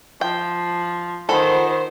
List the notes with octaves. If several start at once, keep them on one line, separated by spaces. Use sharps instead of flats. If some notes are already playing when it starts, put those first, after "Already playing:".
F3 G5
D#3 F4 A4 C5 F#5 B5